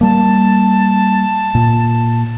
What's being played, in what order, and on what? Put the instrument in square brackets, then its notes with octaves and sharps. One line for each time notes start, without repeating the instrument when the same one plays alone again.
[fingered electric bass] G3 A#3 [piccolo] A5
[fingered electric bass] A#2